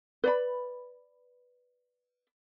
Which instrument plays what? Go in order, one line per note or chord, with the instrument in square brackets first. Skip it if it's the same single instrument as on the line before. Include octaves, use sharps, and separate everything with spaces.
[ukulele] B4 D5 B5